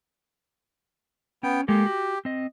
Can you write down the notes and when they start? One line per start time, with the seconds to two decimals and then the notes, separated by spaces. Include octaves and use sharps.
1.43 B3 C#4 G5
1.68 G#3 A#3 G4 A4
1.86 F#4
2.25 C4 D#5